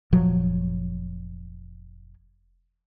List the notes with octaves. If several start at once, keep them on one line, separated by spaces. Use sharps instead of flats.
F1 A#2 F3 F#3